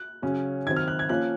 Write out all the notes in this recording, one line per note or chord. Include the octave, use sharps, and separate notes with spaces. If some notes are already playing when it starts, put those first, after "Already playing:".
Already playing: F#6
C#3 F#3 C#4
D#3 F#3 C4 G#6
F6
F#6
G#6
F3 A#3 C#4 F#6